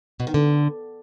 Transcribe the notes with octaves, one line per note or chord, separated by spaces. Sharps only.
B2
D#3
D3